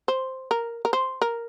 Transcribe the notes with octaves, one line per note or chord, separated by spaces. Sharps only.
C5
A#4
A#4
C5
A#4